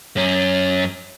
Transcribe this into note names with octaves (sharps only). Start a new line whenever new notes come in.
F#2 C#4